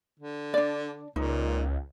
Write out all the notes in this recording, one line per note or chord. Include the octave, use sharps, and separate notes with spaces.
D3
D4 D5
C#2 A#2 D#4